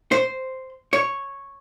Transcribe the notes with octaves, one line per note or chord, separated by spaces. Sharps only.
C5
C#5